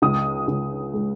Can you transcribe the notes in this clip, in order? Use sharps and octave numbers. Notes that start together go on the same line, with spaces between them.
C#2 D#6
C#2
G#3